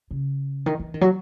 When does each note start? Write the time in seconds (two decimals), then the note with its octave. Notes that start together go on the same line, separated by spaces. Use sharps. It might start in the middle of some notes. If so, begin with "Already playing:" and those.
0.11 C#3
0.66 D#3
0.79 E3
0.94 D#3
1.01 F#3